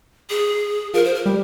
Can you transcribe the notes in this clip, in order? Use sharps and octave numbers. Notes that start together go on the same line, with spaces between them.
G#4
F3 A#4
C5
A#4
G3 G4